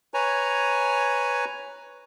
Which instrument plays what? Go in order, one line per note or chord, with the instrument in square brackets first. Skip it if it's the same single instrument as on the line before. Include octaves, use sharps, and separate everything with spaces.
[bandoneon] B4 C#5 G#5 A#5